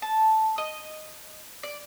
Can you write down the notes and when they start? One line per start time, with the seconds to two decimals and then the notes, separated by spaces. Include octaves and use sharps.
0.02 A5
0.58 D#5
1.63 D5